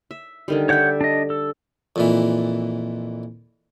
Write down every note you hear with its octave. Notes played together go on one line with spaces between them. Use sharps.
E5
D3 D#3 G3
C#5 D5 E5 F#5 G6
D4 D#5
A4
F2 A#2 E3